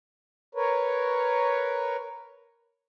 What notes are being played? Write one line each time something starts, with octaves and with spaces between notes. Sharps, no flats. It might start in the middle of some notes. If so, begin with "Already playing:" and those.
A#4 B4 C#5